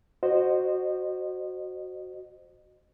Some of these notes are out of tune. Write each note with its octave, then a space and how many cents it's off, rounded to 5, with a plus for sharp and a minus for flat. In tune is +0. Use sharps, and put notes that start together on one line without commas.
F#4 +0 C5 +0 D#5 -25